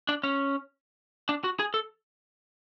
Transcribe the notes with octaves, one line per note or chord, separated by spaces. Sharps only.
D4
C#4
D4
F#4
G#4
A4